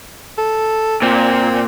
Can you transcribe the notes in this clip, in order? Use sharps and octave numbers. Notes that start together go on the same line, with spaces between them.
A4
A#2 C4